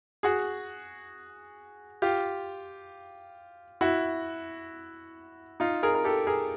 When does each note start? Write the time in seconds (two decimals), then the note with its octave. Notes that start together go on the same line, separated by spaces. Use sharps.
0.23 F#4 G#4
2.02 F4 G4
3.81 E4 F#4
5.60 D#4 F4
5.83 G#4 A#4
5.95 A#4
6.05 G4 A4
6.27 G#4 A#4